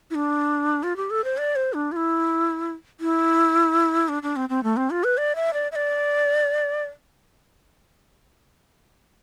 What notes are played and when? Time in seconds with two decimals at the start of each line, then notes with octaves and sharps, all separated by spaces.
0.11 E4
0.15 D4
0.83 F4
0.97 G4
1.10 A4
1.24 C5
1.38 D5
1.56 C5
1.74 D4
1.92 F4
1.96 E4
3.00 E4
4.09 D4
4.23 D4
4.36 C4
4.49 C4
4.63 A3
4.77 C4
4.90 F4
5.04 B4
5.17 D5
5.35 E5
5.53 D5
5.72 E5
5.76 D5